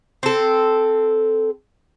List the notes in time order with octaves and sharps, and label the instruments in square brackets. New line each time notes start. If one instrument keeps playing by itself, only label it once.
[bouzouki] C4 A4